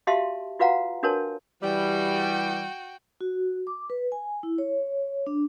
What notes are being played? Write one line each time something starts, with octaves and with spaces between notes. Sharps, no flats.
F#4 G4 E5 F5 A5 C6
F4 F#4 B4 F5 F#5 A#5
D4 F#4 A#4 B4 C#5 A5
E3 G3 F#4 G5
F#4
D6
B4
G#5
E4
C#5
D4